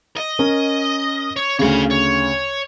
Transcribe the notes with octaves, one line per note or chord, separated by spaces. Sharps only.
D#5
C#4 A#4
C#5
D2 C#3 C#5 F5
C#5